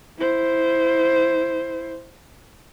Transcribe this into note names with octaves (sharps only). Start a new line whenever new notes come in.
E4 C5